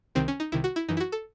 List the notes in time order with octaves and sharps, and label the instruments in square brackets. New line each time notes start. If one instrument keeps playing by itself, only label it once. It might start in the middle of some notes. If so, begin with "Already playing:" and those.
[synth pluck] C2 C3 D#3 C4
C#4
D#4
C2 C3 D#3 E4
F#4
E4
F#2 E3 D#4
E4
F#4
A4